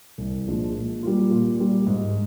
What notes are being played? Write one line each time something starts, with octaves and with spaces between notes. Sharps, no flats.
C2
A#2 F3 G#3 D4
A#2
G3 A#3 F4
A#2
G3 A#3
G#2